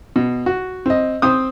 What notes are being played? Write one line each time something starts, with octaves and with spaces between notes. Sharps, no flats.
B2
F#4
C4 D#5
C4 C5 D#6